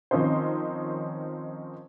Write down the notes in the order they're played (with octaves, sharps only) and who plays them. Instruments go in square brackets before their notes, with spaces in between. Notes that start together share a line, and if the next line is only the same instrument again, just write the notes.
[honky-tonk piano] D#3 F3 C4 C#4 D#4 C5